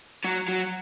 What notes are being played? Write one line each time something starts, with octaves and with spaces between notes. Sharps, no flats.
F#3
F#3